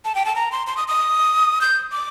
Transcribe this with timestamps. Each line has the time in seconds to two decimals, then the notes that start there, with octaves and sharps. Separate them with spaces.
0.05 A5
0.15 G5
0.26 A5
0.35 A#5
0.52 C6
0.67 C6
0.77 D#6
0.88 D#6
1.61 G6
1.92 D6